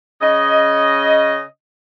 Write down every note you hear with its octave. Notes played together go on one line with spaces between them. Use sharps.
C#3 C#4 D#5